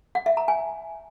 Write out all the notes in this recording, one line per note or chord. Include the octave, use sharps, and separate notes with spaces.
F#5
E5
A#5
G#5